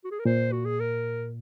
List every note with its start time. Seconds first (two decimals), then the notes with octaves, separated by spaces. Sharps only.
0.05 F#4
0.11 G#4
0.19 A#4
0.25 A#2 C5
0.52 F#4
0.65 G#4
0.80 A#4